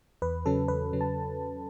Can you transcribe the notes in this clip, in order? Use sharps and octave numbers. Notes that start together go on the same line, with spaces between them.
E2 B4
C#3 F#3 C#4 A4
E2 B4
C#3 F#3 C#4
A5